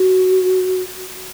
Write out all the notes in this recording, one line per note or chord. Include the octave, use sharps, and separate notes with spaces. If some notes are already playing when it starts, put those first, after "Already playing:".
Already playing: F#4